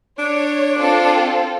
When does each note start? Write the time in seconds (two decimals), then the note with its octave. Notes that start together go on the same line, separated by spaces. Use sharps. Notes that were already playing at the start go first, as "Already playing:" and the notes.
0.19 D4 C#5
0.78 C4 F4 A4